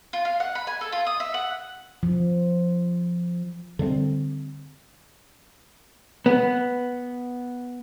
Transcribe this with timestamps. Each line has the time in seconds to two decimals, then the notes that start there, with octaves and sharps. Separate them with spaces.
0.13 F4
0.25 F5
0.40 F#5
0.55 B5
0.67 G#5
0.81 A4
0.92 F4
1.06 D#6
1.20 E5
1.34 F#5
2.03 F3
3.79 D3 G3 A3 C4
6.26 B3